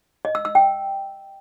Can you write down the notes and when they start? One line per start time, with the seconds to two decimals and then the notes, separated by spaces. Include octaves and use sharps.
0.25 D#5
0.35 E6
0.45 E6
0.55 G5